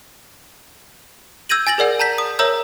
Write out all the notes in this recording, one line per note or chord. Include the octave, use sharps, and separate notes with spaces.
E6 G6 G#6 A#6 D#7 F#7
G#5 A6 A#6 F#7
G#4 A#4 D5 F#5
A5 A#5 G6 B6
D#6
A#4 C#5 E5 A#5 E6 G6